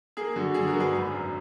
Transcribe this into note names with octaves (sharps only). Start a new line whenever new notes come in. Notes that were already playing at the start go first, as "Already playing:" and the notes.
A#3 G#4
D3 F#4
D3 G#4
F#4 A#4
D3
G#4 B4
G#1
F#2